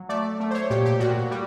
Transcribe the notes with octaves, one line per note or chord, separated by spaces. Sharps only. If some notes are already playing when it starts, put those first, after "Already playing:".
Already playing: F#3
A3 D5
A3
C5
C#5
A#2 G4
G4
A#2 F#4
G3